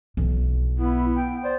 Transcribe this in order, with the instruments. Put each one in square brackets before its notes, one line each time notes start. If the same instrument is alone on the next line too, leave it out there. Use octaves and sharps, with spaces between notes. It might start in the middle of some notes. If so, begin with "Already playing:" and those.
[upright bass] B1 E3
[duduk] B3 [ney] E4
[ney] G5
[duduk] C5 [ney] D5